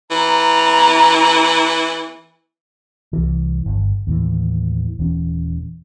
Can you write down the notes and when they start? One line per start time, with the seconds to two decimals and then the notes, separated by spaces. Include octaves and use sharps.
0.11 E3 A#5
3.13 C2 E3
3.66 G1
4.07 D#2 A2 E3
4.99 D#1 E3 C#4